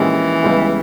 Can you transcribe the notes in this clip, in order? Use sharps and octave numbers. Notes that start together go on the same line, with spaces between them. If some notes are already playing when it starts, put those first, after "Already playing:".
Already playing: A#1 A#2 E3 G#3 C#4 G4
C#2 C#3 G3 B3 G4